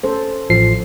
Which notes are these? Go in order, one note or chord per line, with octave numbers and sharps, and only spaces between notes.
C#4 A4 C5
A1 F3 C7